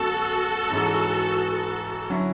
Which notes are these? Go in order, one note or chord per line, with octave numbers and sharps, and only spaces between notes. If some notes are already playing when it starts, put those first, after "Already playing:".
Already playing: F#2 D3 G#3 B3 F#4 A4
G#2 E3 G#3 C#4
D3 F#3 C#4 E4